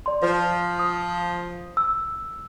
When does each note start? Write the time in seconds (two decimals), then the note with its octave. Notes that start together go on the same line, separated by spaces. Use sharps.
0.06 D5 C6
0.23 F3 C5
0.79 D#6
1.77 E6